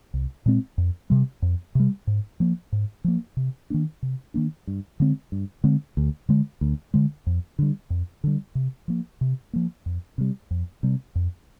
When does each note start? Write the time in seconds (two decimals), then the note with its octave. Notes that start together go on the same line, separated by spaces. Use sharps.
0.14 C2
0.46 A#2 G#3 C4
0.78 F2
1.10 C3 G3
1.42 F2
1.75 C3 G3
2.07 G#2
2.40 F3 A#3
2.72 G#2
3.04 F3 A#3
3.37 C3
3.70 D#3 A#3 D4
4.02 C3
4.34 D#3 A#3 D4
4.67 G2
5.00 D3 G#3 C4
5.32 G2
5.64 D3 G#3 C4
5.97 D2
6.29 D3 G#3
6.61 D2
6.94 D3 G#3
7.27 F2
7.59 D3 G3
7.90 F2
8.24 D3 G3
8.55 C3
8.88 F3 A#3
9.21 C3
9.53 F3 A#3
9.86 F2
10.18 C3 G3
10.51 F2
10.83 C3 G3
11.15 F2